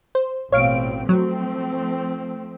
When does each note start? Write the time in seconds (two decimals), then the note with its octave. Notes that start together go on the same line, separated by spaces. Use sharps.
0.15 C5
0.52 A1 B2 C4 C#5 F5 D7
1.09 F3 F#3 A3 C4